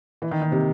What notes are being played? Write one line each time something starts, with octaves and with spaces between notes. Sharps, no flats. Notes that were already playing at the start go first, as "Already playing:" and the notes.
E3
D#3
D#3
C3